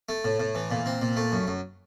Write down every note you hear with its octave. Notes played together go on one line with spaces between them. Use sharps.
A3
A2
A2
E3
A#2
C4
A#2
A3
F#2
F#2